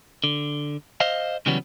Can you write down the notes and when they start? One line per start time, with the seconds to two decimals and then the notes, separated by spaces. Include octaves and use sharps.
0.24 D3
1.00 C5 D#5 F5
1.46 C#3 E3 F#3 G3 B3 C#4